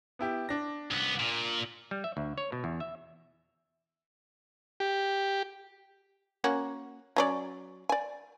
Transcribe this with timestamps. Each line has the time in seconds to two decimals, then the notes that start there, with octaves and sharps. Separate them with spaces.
0.19 B3 E4 G4
0.49 D4 A#6
0.91 C2 B3
1.20 A#2
1.91 G3
2.04 E5
2.17 D2
2.38 C#5
2.52 B2
2.64 E2
2.80 E5
4.80 G4
6.44 A#3 C#4 F#4
7.16 F#3 C#4 D5
7.89 D5 G#5